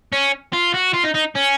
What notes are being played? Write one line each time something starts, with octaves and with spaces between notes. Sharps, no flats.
C#4
F4
F#4
F4
D#4
D#4
C#4